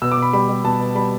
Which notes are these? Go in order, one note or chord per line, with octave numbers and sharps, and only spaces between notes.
B2 E6
D6
B2
B5
G3 B5
G3
B2 A5
B2
G3 B5